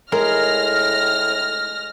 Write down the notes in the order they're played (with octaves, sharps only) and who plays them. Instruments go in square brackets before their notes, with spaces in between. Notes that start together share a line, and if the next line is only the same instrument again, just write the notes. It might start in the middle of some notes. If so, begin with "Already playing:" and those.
[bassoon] A2 [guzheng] G#3 [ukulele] A#4 [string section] F6 A#6